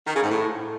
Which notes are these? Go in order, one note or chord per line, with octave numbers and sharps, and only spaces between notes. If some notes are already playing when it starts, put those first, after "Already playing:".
D#3
C#3
G#2
A2